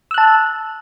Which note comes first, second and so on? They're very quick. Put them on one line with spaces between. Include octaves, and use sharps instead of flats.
E6 F#6 A5